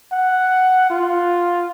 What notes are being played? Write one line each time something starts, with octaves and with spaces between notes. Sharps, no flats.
F#5
F4